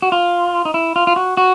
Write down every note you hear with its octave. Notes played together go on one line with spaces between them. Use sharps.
F#4
F4
D#4
E4
F4
F4
F#4
F#4